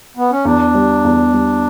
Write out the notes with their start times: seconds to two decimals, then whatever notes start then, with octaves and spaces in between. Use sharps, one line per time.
0.17 B3
0.31 C#4
0.45 E2 D4
0.75 G3
1.05 E2
1.33 G3